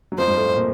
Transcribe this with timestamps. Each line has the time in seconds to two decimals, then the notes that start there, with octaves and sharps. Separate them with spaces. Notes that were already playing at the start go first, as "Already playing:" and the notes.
0.12 F#3
0.18 F2 F3 C5
0.28 G2 G3
0.37 A2 A3
0.56 A#2 A#3